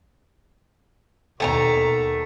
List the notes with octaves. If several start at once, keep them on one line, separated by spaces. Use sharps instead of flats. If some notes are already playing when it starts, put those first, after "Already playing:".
D#2 B2 A3 G#5 A#5